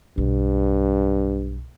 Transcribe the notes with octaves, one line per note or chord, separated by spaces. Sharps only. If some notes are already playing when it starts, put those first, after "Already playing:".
B1 G2